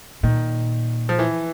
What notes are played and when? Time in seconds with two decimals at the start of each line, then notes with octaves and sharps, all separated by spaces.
0.23 A#2 D#3
1.09 F3
1.19 E3